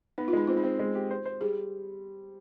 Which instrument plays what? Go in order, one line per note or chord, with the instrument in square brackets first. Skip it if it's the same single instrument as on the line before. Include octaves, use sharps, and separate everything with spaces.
[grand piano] B3 [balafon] D#4
[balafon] F4
[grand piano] G#3 [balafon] D#4
[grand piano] C4 [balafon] F4
[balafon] D#4
[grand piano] C4
G#3
G4
C5
C5
[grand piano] G3 [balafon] G#4